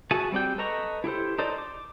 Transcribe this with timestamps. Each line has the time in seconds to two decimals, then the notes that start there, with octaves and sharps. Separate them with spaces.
0.11 F#4 G#4 E5 G#5 A5
0.32 G3 C4 D5 G5
0.58 A4 B4 D#5 A#5 C#6
1.04 E4 G4 A4 C5
1.39 D#4 A4 C5 D5
1.58 D6